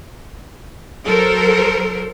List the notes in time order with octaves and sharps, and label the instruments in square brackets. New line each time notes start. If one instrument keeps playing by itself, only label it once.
[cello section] F#3 A4 A#4 C5